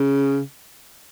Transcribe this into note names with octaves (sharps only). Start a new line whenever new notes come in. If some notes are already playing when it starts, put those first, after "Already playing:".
Already playing: C#3